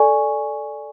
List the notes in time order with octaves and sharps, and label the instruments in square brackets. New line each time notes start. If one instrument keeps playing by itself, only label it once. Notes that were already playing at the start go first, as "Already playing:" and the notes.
Already playing: [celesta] A4 D5 G#5 C#6